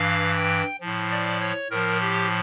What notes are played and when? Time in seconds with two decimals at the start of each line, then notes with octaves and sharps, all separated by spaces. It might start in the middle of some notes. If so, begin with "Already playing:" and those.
Already playing: G2 E3 F5
0.36 G5
0.81 A2 F3
1.11 D5
1.41 C#5
1.70 A2 F3 A#4
2.01 G4